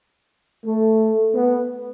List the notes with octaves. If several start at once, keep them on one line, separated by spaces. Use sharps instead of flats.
A3
B3